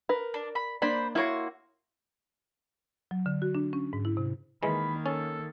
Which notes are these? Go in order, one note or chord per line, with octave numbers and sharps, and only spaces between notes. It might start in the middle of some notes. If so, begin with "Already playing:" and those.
A#4 B4
D4
B5
A#3 D4 C5 D5 B5
A#3 E4 F#4 C#5 C6
F#3
D3
F#4
D4
C#4
G#2
E4
C3
D#3 E3 G#3 A#3 B5
C#4 A4